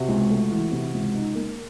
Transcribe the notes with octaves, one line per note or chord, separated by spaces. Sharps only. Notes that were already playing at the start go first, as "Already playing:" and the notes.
Already playing: C3 F#4
C#2
A3
E3
C3
C#2
D#4
A#3